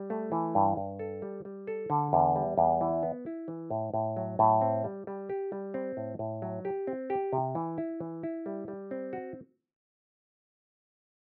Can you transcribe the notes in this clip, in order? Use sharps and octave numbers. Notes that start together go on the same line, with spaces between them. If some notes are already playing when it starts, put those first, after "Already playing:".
Already playing: G3
A3
E3
G2
G2
A4
G3
G3
A4
D3
E2
G3
E2
E3
B3
E4
E3
A2
A2
F#3
A2
C4
G3
G3
G4
G3
C4
A2
A2
F#3
G4
C4
G4
C3
E3
E4
E3
E4
G3
G3
C4
F#4